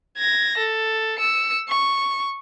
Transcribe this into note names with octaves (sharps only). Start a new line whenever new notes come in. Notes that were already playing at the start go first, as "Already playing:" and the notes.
G#6 A#6
A4
E6 C#7
C#6